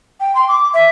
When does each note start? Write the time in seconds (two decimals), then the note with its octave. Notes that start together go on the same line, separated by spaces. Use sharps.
0.20 G5
0.35 C6
0.48 D6
0.73 E5